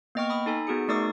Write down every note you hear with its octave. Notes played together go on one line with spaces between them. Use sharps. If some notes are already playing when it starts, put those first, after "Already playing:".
A#3 B3 D#5 G5 C#6 F6
B5 D#6
D#4 A4 G#5
B3 F#4 G#4 C#7
A3 D#4 A#4 D5 C#6 D#6